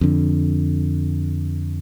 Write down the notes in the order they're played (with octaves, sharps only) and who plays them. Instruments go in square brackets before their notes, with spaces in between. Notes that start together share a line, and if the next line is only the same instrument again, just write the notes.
[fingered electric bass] F2 D3